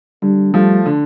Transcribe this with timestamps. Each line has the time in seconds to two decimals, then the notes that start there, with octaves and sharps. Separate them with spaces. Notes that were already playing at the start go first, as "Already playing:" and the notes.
0.22 D3 G3
0.54 F3 G3 A3
0.86 D3